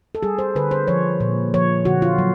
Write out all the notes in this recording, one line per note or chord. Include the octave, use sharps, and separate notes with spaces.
A4
G3 G#4
C5
D3 B4
C5
F3 C#5
A#2
F3 C#5
D3 F#4
F4
F#3